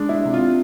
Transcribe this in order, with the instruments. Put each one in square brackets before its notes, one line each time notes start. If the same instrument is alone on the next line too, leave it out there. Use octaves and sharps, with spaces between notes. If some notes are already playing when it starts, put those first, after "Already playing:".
Already playing: [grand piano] G#3 D4
[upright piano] E4
[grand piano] C3
[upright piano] F4